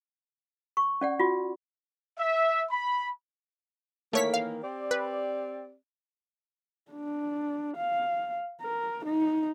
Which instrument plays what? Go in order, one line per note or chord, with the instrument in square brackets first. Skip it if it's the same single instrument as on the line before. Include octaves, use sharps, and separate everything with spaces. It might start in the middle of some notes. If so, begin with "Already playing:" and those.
[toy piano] C#6
C#4 D5 F#5
F4 F#4
[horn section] E5
B5
[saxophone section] D#3 E3 A#3 [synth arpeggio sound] A3 C#5 B6
[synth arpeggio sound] F5
[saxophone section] C4 G4 D5
[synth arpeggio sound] B4
[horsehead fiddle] D4
F5
A#4
D#4